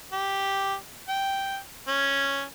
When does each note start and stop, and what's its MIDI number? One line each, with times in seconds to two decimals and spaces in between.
0.12 0.74 67
1.09 1.58 79
1.88 2.43 61